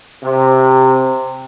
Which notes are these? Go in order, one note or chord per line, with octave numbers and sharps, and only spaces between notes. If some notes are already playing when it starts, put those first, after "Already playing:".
C3